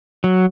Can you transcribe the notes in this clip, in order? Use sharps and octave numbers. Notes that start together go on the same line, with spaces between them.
F#3